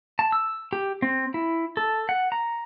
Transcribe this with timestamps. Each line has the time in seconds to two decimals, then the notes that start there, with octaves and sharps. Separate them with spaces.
0.19 A5
0.32 E6
0.73 G4
1.02 C4
1.34 E4
1.77 A4
2.09 F#5
2.32 A#5